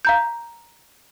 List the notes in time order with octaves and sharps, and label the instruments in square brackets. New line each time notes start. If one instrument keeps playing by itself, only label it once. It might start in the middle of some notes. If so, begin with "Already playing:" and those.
[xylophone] F5 A#5 G6